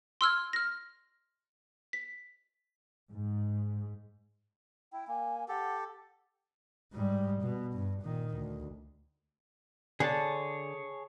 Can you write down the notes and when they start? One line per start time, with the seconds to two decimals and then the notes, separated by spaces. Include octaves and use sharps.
0.21 C6 E6 F6 G#6
0.53 F6 A#6
1.93 B6
3.11 G#2
4.93 E4 G5
5.08 A#3 G#5
5.48 G4 A4 F#5
6.93 G#2 G3
7.42 B2
7.73 G2
8.02 A#2 D#3
8.36 D2
10.00 D3 G#4 C#5 A5